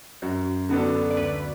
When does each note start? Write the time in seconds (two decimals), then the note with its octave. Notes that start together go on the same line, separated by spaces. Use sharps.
0.22 F#2 F#4
0.69 D3 B3 D4 F#4 A4
1.11 D5
1.17 D2 B4